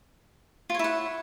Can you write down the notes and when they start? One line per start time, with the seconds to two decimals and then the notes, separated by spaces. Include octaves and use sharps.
0.70 F4
0.74 C#5
0.79 E4
0.84 F#5